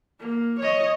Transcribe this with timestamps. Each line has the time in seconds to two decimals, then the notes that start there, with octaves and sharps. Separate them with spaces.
0.20 A#3
0.60 C#5 D#5